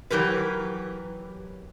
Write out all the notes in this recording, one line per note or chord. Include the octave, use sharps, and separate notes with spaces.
E3 F#3 G4 A#4 B4